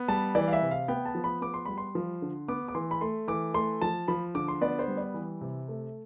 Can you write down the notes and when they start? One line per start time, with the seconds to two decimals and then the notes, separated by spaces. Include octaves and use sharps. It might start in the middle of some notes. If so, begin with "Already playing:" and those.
Already playing: B3
0.08 G3 A5
0.35 E3 D5
0.48 F5
0.53 E5
0.62 C3
0.71 F5
0.88 B3 G5
1.06 A5
1.15 F3
1.24 B5
1.41 B3 D6
1.54 C6
1.65 G3 B5
1.77 C6
1.95 F3
2.22 D3
2.48 B3 D6
2.68 D6
2.75 E3 C6
2.91 B5
3.01 A3 C6
3.28 E3 D6
3.54 A3 C6
3.81 F3 A5
4.08 F3 B5
4.35 D3 D6
4.48 C6
4.61 B3 D5
4.79 C5
4.88 G3
4.97 D5
5.14 E3
5.41 C3
5.68 A3